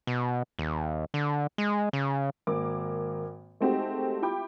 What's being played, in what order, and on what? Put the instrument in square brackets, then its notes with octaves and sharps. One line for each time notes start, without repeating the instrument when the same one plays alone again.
[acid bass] B2
D#2
D3
G#3
C#3
[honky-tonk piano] G#1 A#3 D6
G#3 A3 C4 D#4 F#4 G4
E4 F4 G4 G5 B5 D6